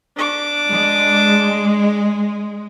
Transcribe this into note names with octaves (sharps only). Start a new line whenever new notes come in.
D4 D6
G#3